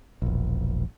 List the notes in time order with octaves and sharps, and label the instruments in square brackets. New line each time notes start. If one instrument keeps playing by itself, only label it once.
[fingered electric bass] E1 A#1